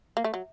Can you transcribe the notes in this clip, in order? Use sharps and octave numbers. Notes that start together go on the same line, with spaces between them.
A#3
A3
F#3